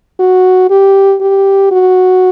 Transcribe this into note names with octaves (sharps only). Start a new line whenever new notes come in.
F#4
G4
G4
F#4